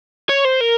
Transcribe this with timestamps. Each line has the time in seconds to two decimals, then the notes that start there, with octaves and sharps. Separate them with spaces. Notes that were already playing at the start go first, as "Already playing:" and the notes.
0.29 C#5
0.45 C5
0.61 A#4